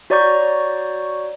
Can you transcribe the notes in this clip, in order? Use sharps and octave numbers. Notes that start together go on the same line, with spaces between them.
F#4 C#5 D5 A#5 C#6 G6